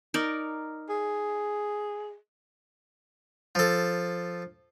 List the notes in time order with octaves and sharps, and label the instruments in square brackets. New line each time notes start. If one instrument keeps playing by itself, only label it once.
[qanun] D#4 A#4 D5
[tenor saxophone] G#4
[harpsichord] F3 A4